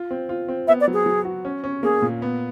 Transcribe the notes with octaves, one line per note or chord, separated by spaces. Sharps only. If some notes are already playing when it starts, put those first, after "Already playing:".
Already playing: F4
C4
F4
C4
B3 E5
D5
F#3
G#4
F#3
F#4
C#4
C#4
A#3 G#4
A#2
B3